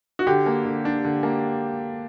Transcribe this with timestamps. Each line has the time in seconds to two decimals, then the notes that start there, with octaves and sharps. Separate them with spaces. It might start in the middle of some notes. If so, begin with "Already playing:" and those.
0.19 F#4
0.27 D3 G4
0.46 A#3
0.65 D3
0.85 D4
1.04 D3
1.23 A#3